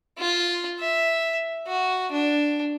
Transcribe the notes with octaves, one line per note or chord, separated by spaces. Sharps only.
F4
E5
F#4
D4